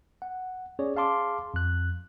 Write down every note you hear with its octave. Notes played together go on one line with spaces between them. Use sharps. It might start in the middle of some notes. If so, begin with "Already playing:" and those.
F#5
C#4 G#4 C#5 D5
G#4 F5 A5 C6 D6
F2 F#6